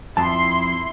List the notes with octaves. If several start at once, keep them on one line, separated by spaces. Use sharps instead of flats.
F2 E4 A5 C6